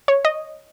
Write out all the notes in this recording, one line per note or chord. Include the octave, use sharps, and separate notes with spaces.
C#5
D#5